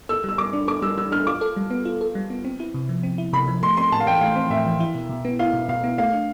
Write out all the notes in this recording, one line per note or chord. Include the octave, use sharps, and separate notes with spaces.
A4 E6
G3 E6
G3 D6
D4
A4 D6
G3 E6
G3 E6
D4 F6
F4 D6
A4
G3
B3
F4
A4
G3
B3
C4
E4
C3
F3
C4
E4
C3 B5
F3
A3 C6
C4 C6
A2 A5
F5
E3 G5
A3 F5
C4
A2 E5
E3
E4
B2
B2
B3
E4 F5
B2
B2 F5
B3
A3 F5
D4